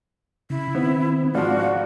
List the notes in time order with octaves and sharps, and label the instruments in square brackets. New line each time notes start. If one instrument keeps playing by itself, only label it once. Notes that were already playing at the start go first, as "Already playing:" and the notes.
[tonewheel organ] C#3 [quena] E4
[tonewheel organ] D#3 C4 [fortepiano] B3
[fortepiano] G#2 F3 [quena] F#4 [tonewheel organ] D5 F5 F#5